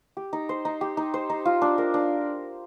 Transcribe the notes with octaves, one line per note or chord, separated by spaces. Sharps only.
G4
D#4
C5
D#4
G4
D#4
C5
D#4
F4
D4
A#4
D4